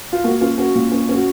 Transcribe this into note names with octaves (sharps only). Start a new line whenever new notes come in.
F4
A#3 F#4
C#4 F4
C#4 F#4
A#2
C#4
C#4
F#4